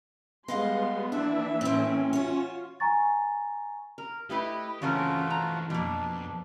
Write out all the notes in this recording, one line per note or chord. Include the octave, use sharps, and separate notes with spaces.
G3 G#3 B3 D#5 F5 F#5 C6
E3 A#3 D4 F#4 E5
A2 C4 C#4
F4 F#4 C#5
G#5 A#5 C#6 A6
A#4
A3 E4 G4 B4 D#5
C#3 E3 A3 C4 C#4 F4 F#4 A#4
A#5
F2 B2 A#3 D4